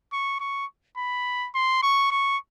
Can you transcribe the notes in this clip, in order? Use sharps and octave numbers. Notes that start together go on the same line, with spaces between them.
C#6
C#6
B5
C6
C#6
C#6